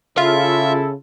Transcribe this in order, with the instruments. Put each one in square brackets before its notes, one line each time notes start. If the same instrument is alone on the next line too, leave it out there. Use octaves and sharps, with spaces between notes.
[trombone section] C#3 [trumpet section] E4 A4 [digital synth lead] F4 [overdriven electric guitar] E5